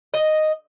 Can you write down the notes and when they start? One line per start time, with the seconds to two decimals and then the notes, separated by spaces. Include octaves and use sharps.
0.14 D#5